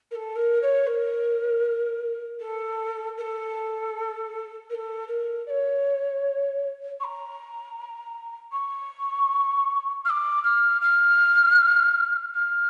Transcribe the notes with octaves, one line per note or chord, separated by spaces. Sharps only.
A#4
A4
A#4
C#5
A#4
A4
A#4
A4
A#4
A4
A#4
D5
C#5
C#6
A#5
C#6
F6
D6
F6
F6
F6